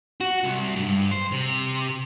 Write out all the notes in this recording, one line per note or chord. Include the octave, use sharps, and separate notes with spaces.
F#4
C2
G2
C5
C3